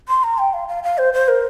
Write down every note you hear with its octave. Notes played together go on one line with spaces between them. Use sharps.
C6
A#5
G5
F5
F5
F5
C5
C5
A#4